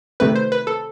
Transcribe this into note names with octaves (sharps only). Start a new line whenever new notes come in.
C3 D#3 A3 C4 B4
C5
B4
A4